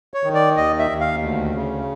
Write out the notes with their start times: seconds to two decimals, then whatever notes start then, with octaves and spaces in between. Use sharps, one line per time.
0.14 C#5
0.24 D#3
0.34 D5
0.57 D#2 D#5
0.79 E5
0.90 D#2
1.00 F5
1.21 D2
1.55 C#3